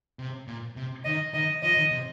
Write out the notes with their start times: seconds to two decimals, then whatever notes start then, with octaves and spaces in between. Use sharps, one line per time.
0.19 C3
0.48 A#2
0.76 C3
1.05 D#3 D#5
1.34 D#3 D#5
1.63 F3 D#5
1.77 D#3
1.91 C3